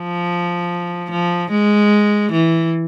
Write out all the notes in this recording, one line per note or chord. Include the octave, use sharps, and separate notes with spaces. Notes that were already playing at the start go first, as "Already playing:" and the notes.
Already playing: F3
F3
G#3
E3